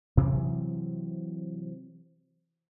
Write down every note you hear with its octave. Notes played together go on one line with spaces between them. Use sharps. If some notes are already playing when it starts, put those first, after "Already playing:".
C3 E3 F#3 C4